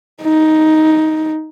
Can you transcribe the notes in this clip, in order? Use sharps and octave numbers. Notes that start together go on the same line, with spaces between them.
D#4